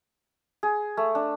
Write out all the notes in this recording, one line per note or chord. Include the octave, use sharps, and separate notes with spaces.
G#4
A3
D4